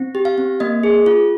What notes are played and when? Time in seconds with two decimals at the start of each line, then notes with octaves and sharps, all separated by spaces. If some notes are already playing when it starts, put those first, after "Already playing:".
Already playing: C4
0.15 G4
0.25 F5
0.38 C4
0.60 A#3 D#5
0.83 G#4
1.06 F4